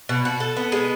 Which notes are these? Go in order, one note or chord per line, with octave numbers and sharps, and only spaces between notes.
B2
F#4
A4
B3
G#3